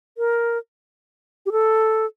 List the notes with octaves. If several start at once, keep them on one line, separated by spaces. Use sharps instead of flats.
A#4
G4
A4